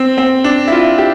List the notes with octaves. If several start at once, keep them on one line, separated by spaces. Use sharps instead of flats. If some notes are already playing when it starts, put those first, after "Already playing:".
Already playing: C4
C4
D4
E4
F4
G4